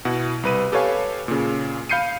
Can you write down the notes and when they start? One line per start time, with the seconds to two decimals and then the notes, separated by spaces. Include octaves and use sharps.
0.05 B2 E4 F#5
0.43 C2 B4 D#7
0.72 G4 A4 B4 C#5 F5 G#5
1.28 A#2 C#3
1.89 F5 B5 G6 C7 C#7 D#7